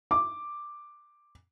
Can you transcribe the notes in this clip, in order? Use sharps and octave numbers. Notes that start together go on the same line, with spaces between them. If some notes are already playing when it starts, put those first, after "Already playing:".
D6